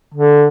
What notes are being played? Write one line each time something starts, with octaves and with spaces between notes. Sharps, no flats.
D3